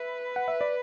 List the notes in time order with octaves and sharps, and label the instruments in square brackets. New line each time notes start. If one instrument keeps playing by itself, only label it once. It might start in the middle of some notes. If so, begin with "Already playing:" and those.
Already playing: [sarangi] B4 [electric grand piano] E5
[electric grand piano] F#5
E5
D5